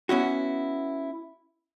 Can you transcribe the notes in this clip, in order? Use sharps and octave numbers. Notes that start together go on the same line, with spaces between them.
B3 C#4 E4 F#4